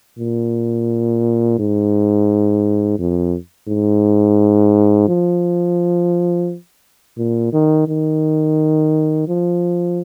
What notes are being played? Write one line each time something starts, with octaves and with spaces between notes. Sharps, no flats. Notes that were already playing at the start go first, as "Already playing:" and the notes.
A#2
G#2
F2
G#2
F3
A#2
D#3
D#3
F3